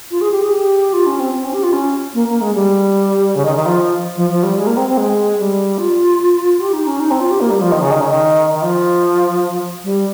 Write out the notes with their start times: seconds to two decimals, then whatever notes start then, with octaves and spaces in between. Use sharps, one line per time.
0.11 F4
0.21 G#4
0.31 G4
0.42 G#4
0.52 G4
0.93 F4
1.06 C#4
1.20 C4
1.34 C4
1.44 C#4
1.53 G4
1.63 F4
1.73 C#4
2.14 A#3
2.28 A#3
2.41 G#3
2.54 G3
3.36 C#3
3.45 D#3
3.56 D#3
3.66 F3
4.17 F3
4.31 F3
4.43 G3
4.58 G#3
4.67 A#3
4.77 C4
4.88 C4
4.98 G#3
5.39 G3
5.78 F4
6.60 G4
6.73 D#4
6.87 C#4
7.00 D#4
7.11 C4
7.20 F4
7.31 G4
7.41 A#3
7.51 G3
7.61 F3
7.72 D#3
7.82 C#3
7.91 D#3
8.01 C#3
8.11 D#3
8.54 D#3
8.62 F3
9.84 G3